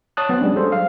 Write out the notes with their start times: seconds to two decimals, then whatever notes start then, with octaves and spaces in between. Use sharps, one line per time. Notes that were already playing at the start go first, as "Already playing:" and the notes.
0.17 C#5 A5 D#6 F#6
0.29 F#3 B3 C4
0.41 G3 G#3 C#4 D4
0.54 F#3 G#4 A4 C5
0.72 F5